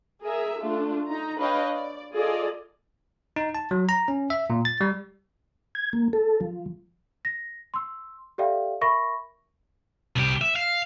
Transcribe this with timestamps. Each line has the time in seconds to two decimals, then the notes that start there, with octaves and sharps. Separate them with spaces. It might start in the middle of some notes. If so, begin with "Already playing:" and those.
0.22 G#4 A#4 E5
0.59 A3 D4 F4
1.09 D#4 A#5
1.38 D4 B4 C#5 D#5 F5 G5
1.72 D5
2.14 F4 G#4 A4 D5 D#5
3.36 D#4
3.55 A5
3.71 F#3
3.89 A#5
4.08 C#4
4.30 E5
4.50 A#2
4.65 A6
4.81 G3
5.75 G#6
5.93 A#3
6.13 A4
6.41 F3
7.25 A#6
7.74 C6 E6
8.38 G4 A4 D5 E5 F5 G5
8.81 A#4 E5 B5 C#6 A#6
10.16 C2 G4
10.41 E5
10.56 F5